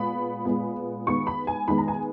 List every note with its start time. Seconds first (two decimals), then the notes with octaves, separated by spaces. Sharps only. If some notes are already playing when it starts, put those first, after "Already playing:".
Already playing: A#2 G#3 B3 B5
0.45 A#2 G#3 B3
1.07 D#3 G#3 B3 C#6
1.27 B5
1.47 G#5
1.68 D#3 G#3 B3 B5
1.78 A#5
1.88 G#5